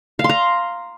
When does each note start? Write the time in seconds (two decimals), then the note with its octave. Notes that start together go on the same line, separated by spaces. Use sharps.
0.19 F5
0.24 C6
0.29 A#5